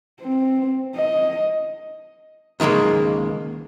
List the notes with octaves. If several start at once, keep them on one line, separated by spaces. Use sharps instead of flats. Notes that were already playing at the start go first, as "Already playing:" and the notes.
C4
D#5
C#2 D#3 F#3 G#3 A#3